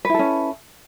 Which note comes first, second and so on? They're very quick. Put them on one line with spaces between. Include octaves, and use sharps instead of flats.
B4 E4 A4 C#4